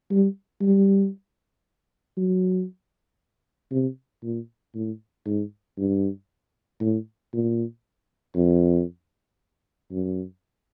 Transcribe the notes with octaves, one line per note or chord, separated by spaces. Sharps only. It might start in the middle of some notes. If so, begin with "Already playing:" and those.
G3
G3
F#3
C3
A#2
A2
G#2
G2
A2
A#2
F2
F#2